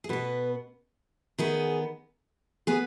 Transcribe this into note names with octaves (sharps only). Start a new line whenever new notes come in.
G#4
B2 B3 B4
D#3 B3 G#4
B3 G#4